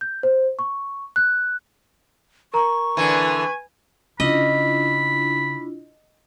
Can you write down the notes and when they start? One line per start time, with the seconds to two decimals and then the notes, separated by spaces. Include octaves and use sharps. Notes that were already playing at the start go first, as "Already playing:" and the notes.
0.01 G6
0.23 C5
0.59 C#6
1.16 F#6
2.54 A#4 A#5 C#6
2.97 D3 E3 B4 G#5
4.20 C#3 D4 E4 F4 D#5 B5